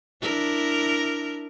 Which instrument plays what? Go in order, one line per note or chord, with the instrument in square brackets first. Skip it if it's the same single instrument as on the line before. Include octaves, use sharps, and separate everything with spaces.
[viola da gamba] D4 E4 A#4